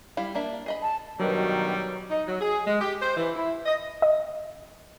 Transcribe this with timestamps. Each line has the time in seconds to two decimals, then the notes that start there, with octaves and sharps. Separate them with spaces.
0.17 G3 E4 F5
0.35 A#3 D4 E5
0.66 G#4 D#5 B5
0.82 A5
1.20 G2 B2 D#3 F#3 G3 A#4 B4
2.10 D#4
2.28 F#3
2.41 G#4
2.67 G#3
2.81 G4
3.01 C5
3.17 E3
3.36 E4
3.65 D#5
4.02 D#5